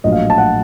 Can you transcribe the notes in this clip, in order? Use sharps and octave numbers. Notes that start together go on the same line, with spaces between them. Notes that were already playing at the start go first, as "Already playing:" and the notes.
A#1 A2 F#3 A3 D#5
F5
A5
F#5